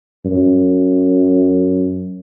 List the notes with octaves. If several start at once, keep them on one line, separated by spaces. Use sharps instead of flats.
F#2